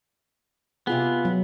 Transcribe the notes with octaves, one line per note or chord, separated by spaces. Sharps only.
C3 B3 F4 G#4
F#3